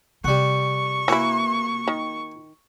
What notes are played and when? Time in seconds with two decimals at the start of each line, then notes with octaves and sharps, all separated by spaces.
0.24 C3 G3 F#5 C#6
1.08 E3 A#3 E4 F#4
1.88 D#3